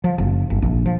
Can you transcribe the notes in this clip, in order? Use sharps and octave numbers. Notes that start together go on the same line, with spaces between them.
F3
F#1
G1
A#1
F3